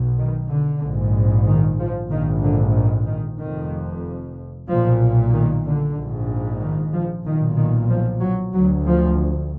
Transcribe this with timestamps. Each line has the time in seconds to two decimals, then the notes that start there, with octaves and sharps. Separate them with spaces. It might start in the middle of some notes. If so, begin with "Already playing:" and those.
Already playing: B1 B2
0.18 D#3
0.50 D3
0.82 A#1 G#2
1.46 D#3
1.79 F3
2.10 A#1 G#2 D#3
2.43 D3
2.74 D#3
3.06 D#3
3.39 F1 F2 D#3
4.67 B1 A#2 F3
5.32 D#3
5.64 D3
5.95 A#1 G#2
6.60 D#3
6.92 F3
7.25 B1 A#2 D#3
7.56 D#3
7.89 F3
8.21 F#3
8.53 D2 F#3
8.85 F3